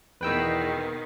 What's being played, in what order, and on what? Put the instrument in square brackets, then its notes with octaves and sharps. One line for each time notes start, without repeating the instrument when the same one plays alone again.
[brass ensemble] E2 [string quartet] B2 D#3 [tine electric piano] B4 G5 E6